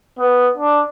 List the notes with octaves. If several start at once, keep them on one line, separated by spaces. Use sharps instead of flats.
B3
D4